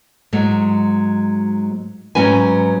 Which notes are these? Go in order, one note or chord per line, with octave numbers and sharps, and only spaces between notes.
G#2 F#3 G#3
G#2 F#3 C#4 B4 G#5